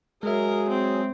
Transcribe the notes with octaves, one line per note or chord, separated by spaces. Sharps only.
F#3 G#3 G#4 A#4 E5
C4